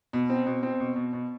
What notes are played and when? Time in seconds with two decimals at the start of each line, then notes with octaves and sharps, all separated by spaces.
0.13 B2
0.30 C4
0.46 B2
0.63 C4
0.80 B2
0.96 B2
1.13 B2